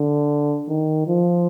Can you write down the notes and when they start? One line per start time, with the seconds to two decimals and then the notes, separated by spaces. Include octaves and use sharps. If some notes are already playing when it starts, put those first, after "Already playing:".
Already playing: D3
0.69 D#3
1.08 F3